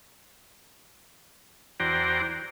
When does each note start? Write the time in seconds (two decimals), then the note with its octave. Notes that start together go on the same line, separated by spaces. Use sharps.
1.80 E2 F#4 C5 D5 G5 A#5